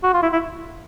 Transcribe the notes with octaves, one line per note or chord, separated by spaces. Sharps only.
F#4
F4
E4
E4